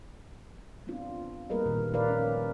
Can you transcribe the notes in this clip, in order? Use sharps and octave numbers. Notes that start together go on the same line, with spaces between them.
B3 C4 D4 F4
G3 A#3 A#4 B4 D#5
A#2 D#3 G3 G#3
A#2 F3 A#4 B4 D5 F5
C#4